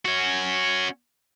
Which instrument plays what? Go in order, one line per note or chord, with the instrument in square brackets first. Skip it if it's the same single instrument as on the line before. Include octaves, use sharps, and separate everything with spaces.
[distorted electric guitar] C#4 F#4